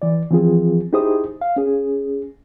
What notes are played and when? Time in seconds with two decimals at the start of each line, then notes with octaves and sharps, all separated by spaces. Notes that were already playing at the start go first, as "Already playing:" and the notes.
0.02 E3 D5
0.31 E3 F3 C4 F4 G#4
0.93 D#4 E4 G4 G#4 C5 D#6
1.41 F5
1.56 C#4 G#4